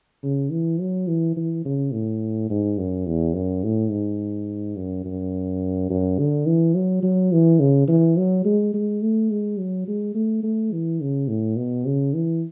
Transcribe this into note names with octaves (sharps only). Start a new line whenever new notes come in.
C#3
E3
F#3
E3
E3
C#3
A2
G#2
F#2
E2
F#2
A2
G#2
F#2
F#2
F#2
D3
E3
F#3
F#3
E3
C#3
E3
F#3
G#3
G#3
A3
G#3
F#3
G#3
A3
A3
E3
C#3
A2
B2
C#3
E3